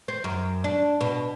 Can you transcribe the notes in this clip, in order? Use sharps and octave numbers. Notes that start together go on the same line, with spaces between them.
C4
F#2
D4
B2